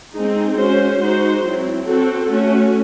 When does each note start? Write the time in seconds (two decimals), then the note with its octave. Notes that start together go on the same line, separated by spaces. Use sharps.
0.15 G#3 C4 D#4 G#4
0.58 G#3 C#4 F#4 C5
1.00 G#3 D#4 F#4 C5
1.43 F#3 C4 E4
1.86 C4 F#4 A4
2.28 A3 C#4 F#4